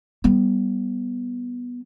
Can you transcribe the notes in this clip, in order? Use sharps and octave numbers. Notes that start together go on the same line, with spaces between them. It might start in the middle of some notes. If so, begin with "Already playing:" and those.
G3 B3